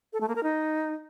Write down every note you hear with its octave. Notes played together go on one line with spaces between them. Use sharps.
A4
A3
A#3
A#4
D#4